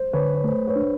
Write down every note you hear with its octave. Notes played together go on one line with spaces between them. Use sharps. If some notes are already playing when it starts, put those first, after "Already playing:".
Already playing: C5
D3 B4 C#5
C#5
A3 C5
B4 C#5
D4